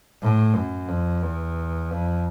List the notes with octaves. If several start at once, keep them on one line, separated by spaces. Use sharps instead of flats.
A2
F#2
F2
E2
F2